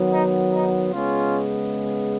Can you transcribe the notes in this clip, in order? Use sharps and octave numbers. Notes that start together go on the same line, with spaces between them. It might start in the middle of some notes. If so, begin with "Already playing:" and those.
Already playing: D#3 F#3 B3
D#4
D#4
C#3 G#3 B3 C#4 F4